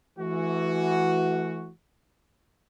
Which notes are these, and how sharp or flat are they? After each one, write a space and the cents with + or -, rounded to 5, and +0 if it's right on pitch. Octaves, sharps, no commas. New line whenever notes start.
E3 +10 A3 -30 F#4 +0